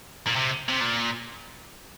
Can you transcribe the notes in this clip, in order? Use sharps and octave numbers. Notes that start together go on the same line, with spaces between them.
A#2
C3
C3
A#2